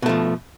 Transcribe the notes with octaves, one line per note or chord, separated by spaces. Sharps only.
B2 F3 A3